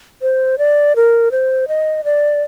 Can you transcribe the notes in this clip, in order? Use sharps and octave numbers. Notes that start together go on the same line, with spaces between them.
C5
D5
A#4
C5
D#5
D5